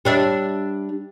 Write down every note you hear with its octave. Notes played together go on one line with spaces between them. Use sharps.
G3 D4 E5